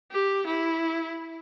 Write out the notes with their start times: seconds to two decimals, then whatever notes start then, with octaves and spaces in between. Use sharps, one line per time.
0.11 G4
0.46 E4